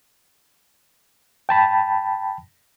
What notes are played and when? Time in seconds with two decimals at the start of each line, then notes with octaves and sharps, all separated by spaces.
1.49 G5 A5 B5